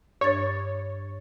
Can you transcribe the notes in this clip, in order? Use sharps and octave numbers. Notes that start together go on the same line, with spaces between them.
G2 D4 C#5 A6